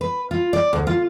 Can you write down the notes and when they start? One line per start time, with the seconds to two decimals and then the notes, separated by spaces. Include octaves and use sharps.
0.01 B4
0.31 F4
0.53 D5
0.73 D2
0.87 F4